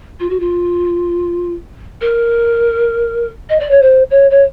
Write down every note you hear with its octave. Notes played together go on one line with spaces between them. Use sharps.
F4
F#4
F4
A#4
D#5
D5
C#5
C5
C#5
C#5